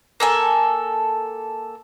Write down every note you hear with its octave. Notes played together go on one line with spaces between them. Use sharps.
A#3 A4 G#5